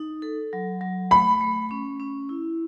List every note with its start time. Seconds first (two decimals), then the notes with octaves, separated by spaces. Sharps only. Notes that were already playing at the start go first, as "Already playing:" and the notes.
Already playing: D#4
0.22 A4
0.53 F#3
0.81 F#3
1.11 A3 B5
1.41 A3
1.71 C#4
2.00 C#4
2.29 E4